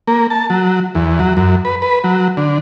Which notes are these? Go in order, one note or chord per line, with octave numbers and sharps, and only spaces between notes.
A#3
A5
F#3
E2
F#3
F#2
B4
B4
F#3
D3